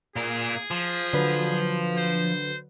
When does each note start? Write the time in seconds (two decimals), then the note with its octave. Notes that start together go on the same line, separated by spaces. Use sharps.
0.16 A#2 G#4 A#4
0.71 F3
1.13 D3 F#3 B4
1.97 C5